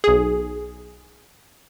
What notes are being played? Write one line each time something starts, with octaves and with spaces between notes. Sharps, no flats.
B1 G#4